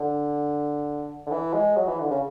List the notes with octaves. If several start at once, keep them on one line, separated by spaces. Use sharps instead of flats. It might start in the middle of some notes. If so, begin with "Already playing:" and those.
Already playing: D3
D3
E3
G#3
F#3
E3
D3
C#3